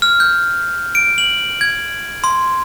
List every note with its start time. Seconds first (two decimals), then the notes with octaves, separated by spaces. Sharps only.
0.02 F6
0.20 G6
0.95 D7
1.18 F#7
1.61 G#6
2.24 C6